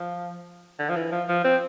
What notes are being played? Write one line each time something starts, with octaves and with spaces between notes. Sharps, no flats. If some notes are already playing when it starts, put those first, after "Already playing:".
Already playing: F3
D3
F3
E3
F3
F3
C4